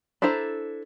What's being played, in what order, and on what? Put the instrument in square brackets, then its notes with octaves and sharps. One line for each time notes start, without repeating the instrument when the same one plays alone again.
[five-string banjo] D4 E4 A4 C5 A#5